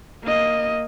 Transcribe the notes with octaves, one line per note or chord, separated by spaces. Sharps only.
A#3 D#5